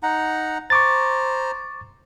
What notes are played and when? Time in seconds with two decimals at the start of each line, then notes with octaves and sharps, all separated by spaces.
0.03 D#4 F#5 A#5
0.70 C5 A#5 C#6 D6 A6